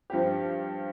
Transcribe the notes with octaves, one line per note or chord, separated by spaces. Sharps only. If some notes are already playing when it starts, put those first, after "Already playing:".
G2 F3 C4 G4